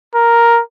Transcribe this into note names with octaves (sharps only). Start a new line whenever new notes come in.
A#4